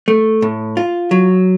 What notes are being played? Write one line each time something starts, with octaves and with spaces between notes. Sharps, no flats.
A3
A2
F4
F#3